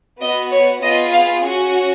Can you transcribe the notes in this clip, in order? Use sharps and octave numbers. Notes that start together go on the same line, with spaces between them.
B3 F#4 D#5
C#5
B3 F4 G#4 D#5
F5
C#4 F#4